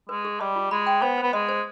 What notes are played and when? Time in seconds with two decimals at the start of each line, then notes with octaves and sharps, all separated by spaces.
0.09 G#3 B4
0.25 G#4
0.40 G3 D#5
0.56 F4
0.71 G#3 B5
0.86 G5
1.02 B3 C5
1.18 C5
1.23 B3
1.33 G#3 D#5
1.49 C5